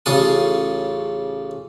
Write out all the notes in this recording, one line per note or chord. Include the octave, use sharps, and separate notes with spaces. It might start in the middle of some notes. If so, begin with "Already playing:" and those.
A1 C#3 F4 A4 D#6